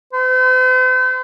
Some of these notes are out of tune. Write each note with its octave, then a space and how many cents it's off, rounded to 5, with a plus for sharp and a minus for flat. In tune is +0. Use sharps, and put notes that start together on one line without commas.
C5 -45